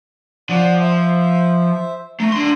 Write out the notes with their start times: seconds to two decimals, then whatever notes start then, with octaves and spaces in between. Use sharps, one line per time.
0.50 F3 D5 F#5
0.81 C5 E5
2.20 A3 A#5
2.32 D4 C6